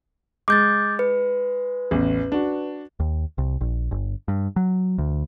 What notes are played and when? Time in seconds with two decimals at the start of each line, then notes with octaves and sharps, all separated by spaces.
0.48 G#3 D6 G6 A6
0.99 B4
1.91 A1 E2
2.32 D4 F#4
3.00 D#2
3.38 C2
3.61 A#1
3.91 G1
4.28 G2
4.56 F#3
4.98 D2